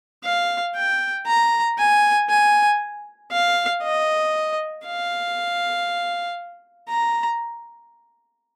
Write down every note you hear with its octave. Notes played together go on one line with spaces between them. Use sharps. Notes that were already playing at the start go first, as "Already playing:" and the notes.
F5
G5
A#5
G#5
G#5
F5
D#5
F5
A#5